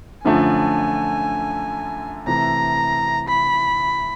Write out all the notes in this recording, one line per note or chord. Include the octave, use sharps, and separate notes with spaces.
F#2 D3 F3 A3 G#5
C3 E3 A3 A#5
B5